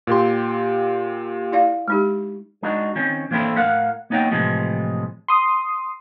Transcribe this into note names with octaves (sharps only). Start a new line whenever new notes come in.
A#2 G4 C6
E4 D5 F5
G#3 D#4 G4
G#3 D4 D#4 F#4
D#3 C4 C#4
E3 A#3 C4 D4 E4 A4
A2 A#4 F5 F#5
A#3 B3 D#4 C#5 F#5 G5
A2 C3 E3 F3 G#3
C6 D#6